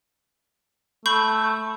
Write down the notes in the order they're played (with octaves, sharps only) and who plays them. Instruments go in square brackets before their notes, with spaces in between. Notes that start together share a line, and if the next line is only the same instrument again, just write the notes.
[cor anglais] A3 [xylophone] B5 C#6 G6